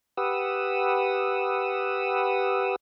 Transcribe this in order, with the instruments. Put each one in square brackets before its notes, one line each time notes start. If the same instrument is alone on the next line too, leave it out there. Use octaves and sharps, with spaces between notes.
[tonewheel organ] G4 B4 F#5 D#6 E6